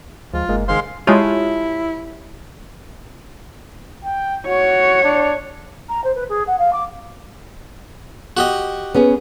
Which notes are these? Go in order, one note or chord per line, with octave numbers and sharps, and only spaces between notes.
D2 F3 G#3 F4
F#1 G#2 G#3 A#3
C#2 D#3 G#3 C5 F5 C6
G#3 E4 F4 G4 C#5 A5
G5
F#4 C#5
D4
A#5
C5
B4
G#4
F#5
F5
D6
F#4 G4 D#5
B3 C#4 G#4